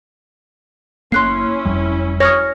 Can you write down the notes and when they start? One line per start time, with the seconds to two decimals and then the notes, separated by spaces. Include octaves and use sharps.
1.12 F#1 A#3 C#4 E4 C6 F#6 C7
1.65 F#1 F2 G3
2.20 C#5 D#6 F6 A#6